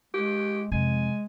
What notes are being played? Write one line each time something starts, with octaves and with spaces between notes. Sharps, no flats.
G#3 G4
F2 C3 G#3 G#5